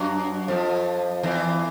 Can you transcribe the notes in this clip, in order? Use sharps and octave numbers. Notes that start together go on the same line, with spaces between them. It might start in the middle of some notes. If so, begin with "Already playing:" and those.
Already playing: F#2 F#3
F2 F3
E2 E3